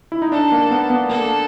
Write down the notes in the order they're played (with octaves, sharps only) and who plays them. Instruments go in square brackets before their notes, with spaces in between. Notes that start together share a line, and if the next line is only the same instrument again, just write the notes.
[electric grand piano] E4
D#4
[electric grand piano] D4 [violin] A4
[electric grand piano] A#3
B3
B3
[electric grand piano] A#3 [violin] A4